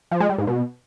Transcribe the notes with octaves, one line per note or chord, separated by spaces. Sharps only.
F3
G#3
G3
G#2
B2